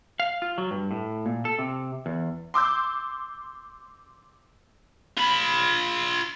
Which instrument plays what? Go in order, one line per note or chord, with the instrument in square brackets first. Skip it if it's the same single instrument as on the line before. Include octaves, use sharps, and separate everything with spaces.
[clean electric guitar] F5
F4
F#3
G2
A2
A#2
A4
C3
E2
[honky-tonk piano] C6 D6 E6 G6
[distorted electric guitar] F4 B5